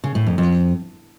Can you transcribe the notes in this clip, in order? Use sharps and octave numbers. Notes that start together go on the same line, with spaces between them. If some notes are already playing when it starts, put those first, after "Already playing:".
C#3
A2
F2
F2